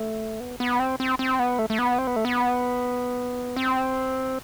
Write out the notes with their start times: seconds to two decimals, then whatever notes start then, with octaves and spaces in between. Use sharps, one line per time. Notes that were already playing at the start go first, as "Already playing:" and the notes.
Already playing: A3
0.40 B3
0.60 B3
0.80 C4
1.00 C4
1.19 C4
1.39 B3
1.59 A3
1.70 A3
1.79 B3
1.98 C4
2.07 B3
2.16 A3
2.25 B3
3.56 C4